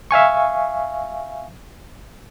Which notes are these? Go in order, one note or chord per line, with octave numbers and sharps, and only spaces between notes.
E5 F5 G#5 C#6